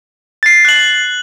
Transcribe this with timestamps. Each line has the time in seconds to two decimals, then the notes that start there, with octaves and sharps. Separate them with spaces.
0.43 A6 C7
0.65 F#6 F#7